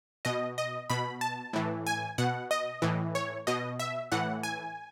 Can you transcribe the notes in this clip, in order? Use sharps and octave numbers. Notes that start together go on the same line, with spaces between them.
B2 D#5
D#5
B2 B5
A5
A2 E3
G#5
B2 F#5
D#5
A2 E3
C#5
B2 D#5
E5
A2 E3 F#5
G#5